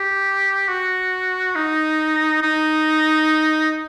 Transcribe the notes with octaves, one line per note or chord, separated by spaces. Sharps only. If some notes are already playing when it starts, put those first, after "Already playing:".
Already playing: G4
F#4
D#4
D#4